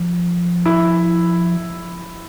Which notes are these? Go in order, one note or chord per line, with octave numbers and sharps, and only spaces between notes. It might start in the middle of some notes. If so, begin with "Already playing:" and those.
Already playing: F3
E4